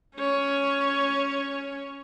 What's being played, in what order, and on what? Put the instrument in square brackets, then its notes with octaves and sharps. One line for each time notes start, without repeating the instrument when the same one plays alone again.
[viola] C#4 C#5